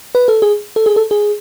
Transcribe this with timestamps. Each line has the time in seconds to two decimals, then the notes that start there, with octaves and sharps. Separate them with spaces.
0.15 B4
0.28 A4
0.42 G#4
0.76 A4
0.86 G#4
0.96 A4
1.11 G#4